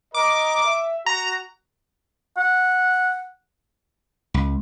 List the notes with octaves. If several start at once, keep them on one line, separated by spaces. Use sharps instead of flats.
A#4 D#5 D6
E5
F#4 A#5
F#5
C#2